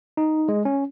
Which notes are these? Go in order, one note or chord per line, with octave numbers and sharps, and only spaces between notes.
D#4
G#3
C#4